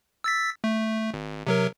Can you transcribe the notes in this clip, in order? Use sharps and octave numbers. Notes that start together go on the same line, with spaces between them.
E6 A6 B6
A3
G#1
C3 F#3 A#4